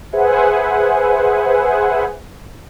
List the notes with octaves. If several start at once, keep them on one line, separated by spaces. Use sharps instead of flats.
G#4 B4 C5 E5 F#5 G#5